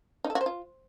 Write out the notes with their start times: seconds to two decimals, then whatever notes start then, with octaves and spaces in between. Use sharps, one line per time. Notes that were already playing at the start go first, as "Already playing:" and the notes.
0.24 D#4
0.30 A4
0.35 F#4
0.41 C5
0.46 F4